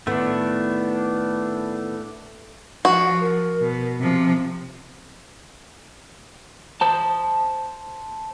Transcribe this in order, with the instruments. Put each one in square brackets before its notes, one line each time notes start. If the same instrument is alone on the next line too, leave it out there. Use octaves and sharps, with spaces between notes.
[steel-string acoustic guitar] A2 D#3 B3 [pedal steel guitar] A3 D4
[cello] F3 [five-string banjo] F#4
[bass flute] A#4
[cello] B2
[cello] C3 F3 [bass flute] C4
[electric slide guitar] C5 A5